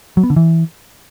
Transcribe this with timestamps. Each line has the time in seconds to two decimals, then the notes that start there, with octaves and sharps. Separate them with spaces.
0.17 F#3
0.24 B3
0.30 D3
0.36 E3